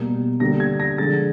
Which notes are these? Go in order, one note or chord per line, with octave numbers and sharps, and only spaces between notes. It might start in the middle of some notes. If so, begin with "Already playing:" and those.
Already playing: B2 G3 A#3
D3 G3 A#3 A#6
G#6
A#6
D3 F3 G#3 A6